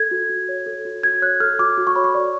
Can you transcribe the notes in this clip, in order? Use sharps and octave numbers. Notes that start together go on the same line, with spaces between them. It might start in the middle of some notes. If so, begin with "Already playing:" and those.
Already playing: A4 G#6
F#4
F#4
C#5
A4
F#4
F#4 G#6
C#5 F#6
A4 F6
F#4 D6
F#4
C#6
C#5 B5
C#6
D5